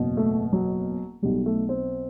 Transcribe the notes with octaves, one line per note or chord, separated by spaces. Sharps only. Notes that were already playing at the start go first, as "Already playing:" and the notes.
Already playing: F#1 E2 B2
A3
F#3
B1 B2 F#3 G3
A3
C4